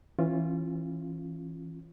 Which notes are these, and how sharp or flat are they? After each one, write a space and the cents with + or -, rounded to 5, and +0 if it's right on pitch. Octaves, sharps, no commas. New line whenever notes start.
E3 +0 C#4 -35 F4 +0